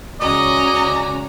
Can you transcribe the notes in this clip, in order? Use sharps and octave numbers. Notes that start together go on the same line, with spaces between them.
C#2 C#4 F#4 D5 D#5 G#5 A#5